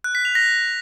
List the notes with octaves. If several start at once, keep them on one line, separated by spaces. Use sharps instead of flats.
F#6
B6
F7
A#6